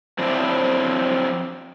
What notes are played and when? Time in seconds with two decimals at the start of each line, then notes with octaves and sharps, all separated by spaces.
0.19 F3 F#3 C4 D4 E4